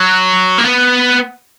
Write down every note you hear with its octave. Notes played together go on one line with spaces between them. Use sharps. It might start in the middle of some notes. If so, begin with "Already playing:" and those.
Already playing: F#3
A#3
B3